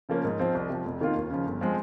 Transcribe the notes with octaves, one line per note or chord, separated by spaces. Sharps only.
C#3 F3 A#3 C#4
G#2
F3 C4
C2
C3 F3
F1
F2 D#3 A#3 F4
D#2
C#3 F3
G1
F3 G#3 C4